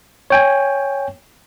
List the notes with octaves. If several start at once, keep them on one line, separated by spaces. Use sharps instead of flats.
C#5 G5 G#5